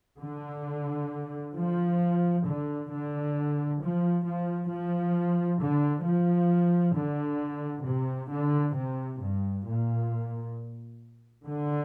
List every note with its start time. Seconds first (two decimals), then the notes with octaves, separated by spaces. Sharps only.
0.20 D3
1.55 F3
2.45 D3
2.89 D3
3.80 F3
4.25 F3
4.69 F3
5.60 D3
6.05 F3
6.94 D3
7.85 C3
8.30 D3
8.74 C3
9.20 G2
9.65 A#2
11.45 D3